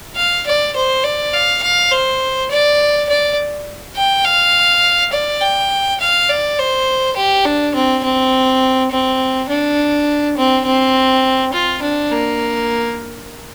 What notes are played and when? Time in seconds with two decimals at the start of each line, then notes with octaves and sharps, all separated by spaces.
0.17 F5
0.47 D5
0.76 C5
1.04 D5
1.34 F5
1.63 F5
1.91 C5
2.51 D5
3.09 D5
3.96 G5
4.25 F5
5.13 D5
5.41 G5
6.00 F5
6.29 D5
6.59 C5
7.16 G4
7.45 D4
7.75 C4
8.04 C4
8.91 C4
9.49 D4
10.37 C4
10.65 C4
11.53 F4
11.82 D4
12.12 A#3